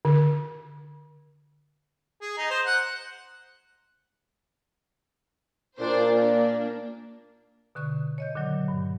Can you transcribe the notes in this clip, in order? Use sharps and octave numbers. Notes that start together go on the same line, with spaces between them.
D3
G#4
D#4
C5
F#5
A#2 D4 C5
A#3 D4
B2 D3 C#6 F#6
C#5 D#5 G6
A#2 D3 D#3 F#3
G2